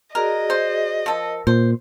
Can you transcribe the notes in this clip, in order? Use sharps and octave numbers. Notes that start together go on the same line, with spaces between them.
F#4 G#4 A#4 D5 D#5
C5
F3 A4 A#4
A#2 C5